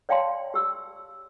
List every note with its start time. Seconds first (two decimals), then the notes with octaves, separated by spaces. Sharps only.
0.09 C#5 D5 F5 G5 A5 C6
0.54 G4 E6